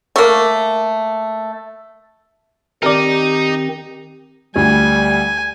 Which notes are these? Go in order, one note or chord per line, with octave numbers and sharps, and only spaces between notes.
A3 A#3
D#3 C4 D#4 G4 A#4 D5
D2 G3 G#5